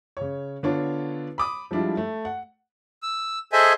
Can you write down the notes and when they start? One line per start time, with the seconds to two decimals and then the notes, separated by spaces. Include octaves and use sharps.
0.17 C#3 C#5
0.63 D3 B3 D4 F4 C#5
1.38 B5 D6 D#6
1.71 F3 G3 G#3 D4 E4 F4
1.97 A3
2.25 F#5
3.03 E6
3.53 G#4 A4 C5 D#5 E5 G#5